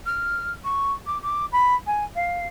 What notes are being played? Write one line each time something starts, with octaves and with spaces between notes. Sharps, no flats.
F6
C#6
D6
D6
B5
G#5
F5